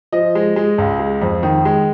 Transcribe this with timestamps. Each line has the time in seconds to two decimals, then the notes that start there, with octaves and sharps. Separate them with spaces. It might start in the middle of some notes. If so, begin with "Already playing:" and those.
0.13 F3 D#5
0.35 G#3
0.56 G#3
0.78 C#2
0.99 G#3
1.22 F2
1.43 D#3
1.65 G#3